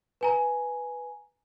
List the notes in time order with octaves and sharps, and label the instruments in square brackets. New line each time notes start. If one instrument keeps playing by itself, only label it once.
[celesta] B4 G#5 A#5